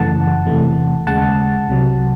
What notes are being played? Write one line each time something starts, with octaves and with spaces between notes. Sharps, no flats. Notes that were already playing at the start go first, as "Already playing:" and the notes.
Already playing: F#2 C#3 E3 A3 F#5 A5
E2 C3 E3 A3
D#2 C#3 G#3 F#5 A5
C2 C3 F#3